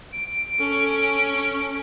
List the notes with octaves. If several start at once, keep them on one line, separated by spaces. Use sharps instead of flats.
D7
C#4 A4